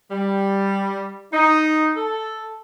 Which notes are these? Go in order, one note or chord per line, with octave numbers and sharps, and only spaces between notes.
G3
D#4
A4